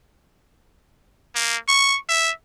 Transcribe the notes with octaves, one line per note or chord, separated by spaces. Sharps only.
A#3
C#6
E5